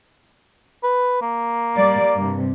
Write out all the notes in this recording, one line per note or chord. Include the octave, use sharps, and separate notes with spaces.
B4
A#3
G3 D5
G2 C3